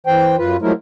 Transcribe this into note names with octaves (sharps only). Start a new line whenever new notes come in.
E3 C5 G5
F#2 F4 B4
F3 F#3 G#3 A3 E4 A#4